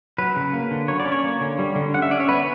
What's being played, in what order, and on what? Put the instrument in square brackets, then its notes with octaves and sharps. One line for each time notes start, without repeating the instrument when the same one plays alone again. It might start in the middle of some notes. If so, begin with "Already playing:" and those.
[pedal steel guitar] F#3 B4
C#3
A#3
D3
F#3 C#5
D5
C#4
C#5
A#3
D3
G3
D3
C#4 F#5
E5
C#4 D5
C#5
B3 B4